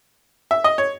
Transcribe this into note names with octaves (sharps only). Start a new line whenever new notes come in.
E5
D#5
C#5